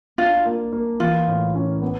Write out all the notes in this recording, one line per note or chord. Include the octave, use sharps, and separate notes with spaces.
D4 F4
A#3
A#3
E3 F4
A2
C#4
B3